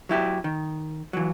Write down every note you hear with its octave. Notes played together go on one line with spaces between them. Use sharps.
F#3 E4 G4
D#3
E3 F#3